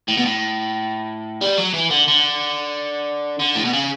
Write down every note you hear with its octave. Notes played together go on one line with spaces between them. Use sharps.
A2
B2
A2
G3
F#3
E3
D3
D3
D3
A2
B2
C#3